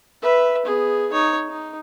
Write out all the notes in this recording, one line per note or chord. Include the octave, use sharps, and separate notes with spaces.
B4 E5
B3 G#4
D#4 C#5
D#4